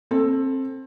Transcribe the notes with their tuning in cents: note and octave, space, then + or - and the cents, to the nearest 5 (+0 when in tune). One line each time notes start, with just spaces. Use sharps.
C4 +25 A4 +0